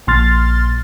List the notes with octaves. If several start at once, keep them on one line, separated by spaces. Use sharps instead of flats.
A#1 A#2 C6 F6 A6